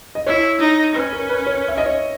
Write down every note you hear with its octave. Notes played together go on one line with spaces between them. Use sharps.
D#5
E4 C#5
D#4
C#4 B4
A#4
B4
C#5
E5
D#5
C#5